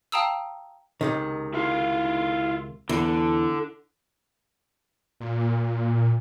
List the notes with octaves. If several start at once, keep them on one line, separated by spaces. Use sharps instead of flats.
F5 G5 A5 A#5 D#6 E6
C#2 C3 D#3
E4 F4 F5
E2 D3
A#2